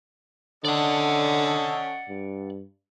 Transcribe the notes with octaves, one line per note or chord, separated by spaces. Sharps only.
D3 C#4 A4 D5 D#5 F#5
G2